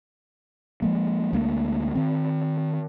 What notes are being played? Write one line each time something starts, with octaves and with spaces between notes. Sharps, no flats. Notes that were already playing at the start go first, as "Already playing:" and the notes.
F3 G#3 A#3
D2 G#3 A#3
D#3 C4